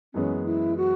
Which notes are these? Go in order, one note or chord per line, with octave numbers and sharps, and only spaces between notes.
F#2 E3 G#3 B3 C#4
E4
F#4